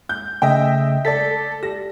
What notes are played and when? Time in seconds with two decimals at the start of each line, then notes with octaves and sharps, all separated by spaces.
0.09 G6
0.42 C#3 A3 D#5 E5 G5
1.05 A4 D5 A5 A6 B6
1.63 G4 A#6